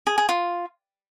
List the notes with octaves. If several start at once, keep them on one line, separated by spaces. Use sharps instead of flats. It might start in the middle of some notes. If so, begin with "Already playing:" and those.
G#4
G#4
F4